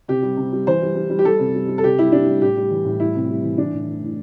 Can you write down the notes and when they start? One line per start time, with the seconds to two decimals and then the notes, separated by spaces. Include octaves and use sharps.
0.08 C3 G4
0.22 G3
0.37 C3
0.53 G3
0.67 E3 C5
0.81 G3
0.95 G3
1.10 G3
1.19 G4
1.24 G3 A4
1.39 C3
1.55 G3
1.68 G3
1.78 A4
1.83 C3 G4
1.99 G3 E4
2.12 G3 D4
2.26 G3
2.41 A2 G4
2.57 G3
2.71 E3
2.85 A2
3.00 G3 E4
3.15 C3
3.29 G3
3.43 E3
3.58 E3 D4
3.73 A2
3.87 E3
4.03 A2